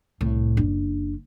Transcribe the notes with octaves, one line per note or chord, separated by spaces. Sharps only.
C2 A2
F#1 D4